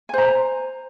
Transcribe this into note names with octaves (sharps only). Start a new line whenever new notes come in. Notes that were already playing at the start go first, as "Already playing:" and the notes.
C5 G#5 A#5